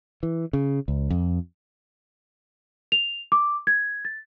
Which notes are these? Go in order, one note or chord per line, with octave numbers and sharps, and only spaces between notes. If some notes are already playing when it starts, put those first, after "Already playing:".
E3
C#3
C#2
F2
F7
D6
G#6
A6